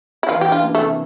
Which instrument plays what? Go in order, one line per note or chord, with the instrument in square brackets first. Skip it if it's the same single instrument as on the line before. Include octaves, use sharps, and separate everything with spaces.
[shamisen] E4
[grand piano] E3 [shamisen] F4
[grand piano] D4 [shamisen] G4
[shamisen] F4
[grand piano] A#3
[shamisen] A3
[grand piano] C3